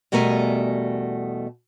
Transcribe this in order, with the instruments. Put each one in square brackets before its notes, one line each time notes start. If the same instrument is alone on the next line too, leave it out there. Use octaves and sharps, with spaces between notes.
[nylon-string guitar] E2 B2 G3 A3 A#4 G#5